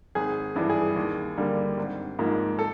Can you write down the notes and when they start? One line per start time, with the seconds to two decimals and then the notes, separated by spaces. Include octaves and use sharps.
0.15 G#1 G#4
0.56 G2 E3 G3
0.70 G#4
0.96 D#2
1.37 D3 G3 A#3
1.77 G#1
2.19 G#2 F3 A#3
2.59 A4